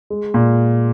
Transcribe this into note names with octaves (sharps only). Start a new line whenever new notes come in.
G#3
A#2